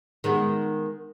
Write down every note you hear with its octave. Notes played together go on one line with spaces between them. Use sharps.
D#3 G#3 B3